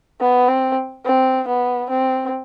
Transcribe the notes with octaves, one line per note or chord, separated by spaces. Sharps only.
B3
C4
C4
B3
C4